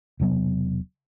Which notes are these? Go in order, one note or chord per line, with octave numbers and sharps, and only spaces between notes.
E1 C3 F#3 B3